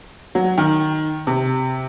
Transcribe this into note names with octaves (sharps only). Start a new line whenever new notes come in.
F#3
D#3
C3